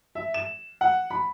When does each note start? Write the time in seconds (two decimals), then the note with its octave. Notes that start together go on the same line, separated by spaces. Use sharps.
0.15 E5
0.34 E7
0.81 F#5
1.10 B5